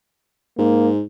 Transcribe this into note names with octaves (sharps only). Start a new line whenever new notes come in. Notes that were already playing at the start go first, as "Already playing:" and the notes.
G#2 A#3